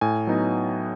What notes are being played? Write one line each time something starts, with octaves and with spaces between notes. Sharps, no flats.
A2 G#5
F#3 B3 D#4